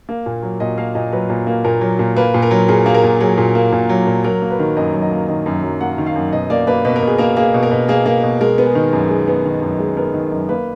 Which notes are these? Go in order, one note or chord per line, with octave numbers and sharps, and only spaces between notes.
A#3
A#2
F#3
A#2 D#5
A#3 F5
A#2 D#5
F#3 B4
A#2
A#3
A#2 A#4
F#3
A#2
A#3 B4
A#2
A#4
F#3
A#2 G#4
A#3 G#4
A#4
A#2
F#3 G#4
A#2
A#3
A#2
F#3
A#2
F#3 A#4
A#3
B4
D#3
F#2 D#5
F#3
D#5
A#3
D#3 D#5
F#2
F#3
A#3 F#5
D#3
F5
F#2
B2 D#5
A#3 D5
A#3 B4
B2 B4
A#4
B2
G#4
A#3 A#4
A#3 G#4
B2
A#4
B2
A#3 G#4
A#3
B2
G#3 A#4
B3
G#4
D#3
F#2
G#3
B3
D#3
F#2
G#3
B3 A#4
D#3
F#2
A#3 B4